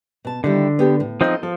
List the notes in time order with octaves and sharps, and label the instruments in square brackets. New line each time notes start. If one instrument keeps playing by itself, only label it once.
[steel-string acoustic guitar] B2 A5
[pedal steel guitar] D3 [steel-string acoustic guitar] D#3 G3 E4
[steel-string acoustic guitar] B3 G4 A4
A2
[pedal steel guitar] F3 C4 D#4 [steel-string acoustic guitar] A4 D#5
[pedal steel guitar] F3 [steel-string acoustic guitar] A4